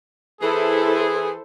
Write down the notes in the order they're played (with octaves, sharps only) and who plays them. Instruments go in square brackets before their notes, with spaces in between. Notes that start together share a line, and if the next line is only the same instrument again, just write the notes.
[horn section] E3 G#4 [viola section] E4 A4 C5